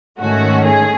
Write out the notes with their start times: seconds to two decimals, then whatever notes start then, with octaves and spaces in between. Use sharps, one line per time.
0.20 G#2 D#3 A3 C#4 F#4
0.65 G#4